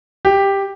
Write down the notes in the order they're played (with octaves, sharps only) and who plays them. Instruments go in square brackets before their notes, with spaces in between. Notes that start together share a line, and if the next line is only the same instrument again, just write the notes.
[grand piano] G4